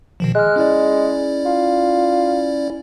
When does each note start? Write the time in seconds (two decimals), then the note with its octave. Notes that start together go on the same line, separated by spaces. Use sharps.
0.20 B2 D#3 F3
0.35 G#3 F6 F#6
0.56 C#4 E4 D5
1.45 F4